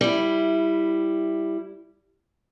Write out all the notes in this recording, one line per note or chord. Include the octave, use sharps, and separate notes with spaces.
G3 E4